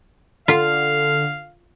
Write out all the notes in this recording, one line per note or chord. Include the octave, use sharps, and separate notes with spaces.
D3 F4 F5